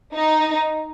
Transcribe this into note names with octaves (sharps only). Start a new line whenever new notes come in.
D#4